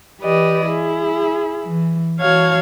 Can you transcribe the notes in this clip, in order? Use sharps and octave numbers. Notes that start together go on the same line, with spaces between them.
E3 G4 B4 D5 D#5
E4 G#4
E3
E3 F#4 C#5 F5 A5 G#6